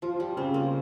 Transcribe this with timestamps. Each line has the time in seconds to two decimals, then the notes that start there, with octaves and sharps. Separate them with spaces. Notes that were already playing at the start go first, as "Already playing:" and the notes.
0.02 F3 F4
0.19 G3 F4
0.37 C#3 C4
0.54 A#3 F4